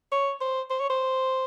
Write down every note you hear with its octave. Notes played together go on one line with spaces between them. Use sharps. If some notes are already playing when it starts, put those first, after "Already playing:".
C#5
C5
C5
C#5
C5